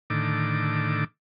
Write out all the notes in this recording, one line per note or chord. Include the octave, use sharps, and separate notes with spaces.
A2 D3 D#3 D6